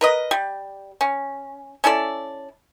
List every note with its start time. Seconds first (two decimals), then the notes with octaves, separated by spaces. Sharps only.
0.01 A#4 B4 D#5
0.31 G3
1.01 C#4
1.84 C#4 E4 A4 D5